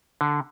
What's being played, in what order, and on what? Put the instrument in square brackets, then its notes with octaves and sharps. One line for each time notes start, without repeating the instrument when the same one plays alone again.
[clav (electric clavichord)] D3